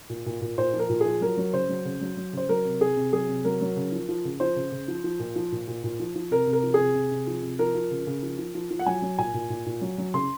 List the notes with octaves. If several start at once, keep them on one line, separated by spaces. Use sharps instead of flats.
A#2
A#2
A#2
A#2 C5
F3
A#4
A#2
G#4
F3
F#3 A#4
F#3
C#3 C5
F#3
C#3
F#3
F#3
C#3 C5
F#3 A#4
C3
C3 G#4
C3
F#3 G#4
C3
F#3 A#4
F#3
C#3
F3
F3
C#3
F3 C5
C#3
C#3
F3
F3
A#2
F3
A#2
A#2
A#2
F3
F3
C3 A#4
C3
A#4
F3
G#4
C3
C3
C3
F3
C3
F3 A#4
F3
C#3
C#3
F3
F3
F3
F3
F#5
F#3 G#5
F#3
A#2 G#5
A#2
A#2
A#2
F#3
F#3
C#3 C6